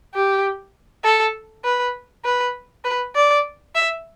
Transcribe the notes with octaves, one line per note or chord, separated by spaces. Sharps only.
G4
A4
B4
B4
B4
D5
E5